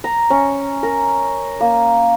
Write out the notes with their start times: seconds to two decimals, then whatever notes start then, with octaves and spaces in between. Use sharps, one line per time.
0.04 A#5
0.30 C#4
0.83 A#4
1.60 A#3